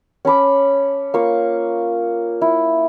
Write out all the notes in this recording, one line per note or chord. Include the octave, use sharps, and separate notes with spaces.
C#4 A5 B5 D6
A#3 F4 C#6
E4